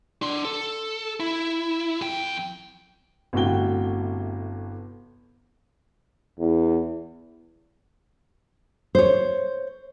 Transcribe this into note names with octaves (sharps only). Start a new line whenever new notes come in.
D4 C6
A4
E4
F2 G5
G1 A2 C3 F#4 G5 G7
E2
C5 C#5